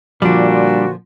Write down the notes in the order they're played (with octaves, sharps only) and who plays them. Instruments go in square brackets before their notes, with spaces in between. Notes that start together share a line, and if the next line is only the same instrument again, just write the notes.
[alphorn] A#2 [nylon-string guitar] D3 F3 [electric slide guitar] G3 D4 [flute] F#4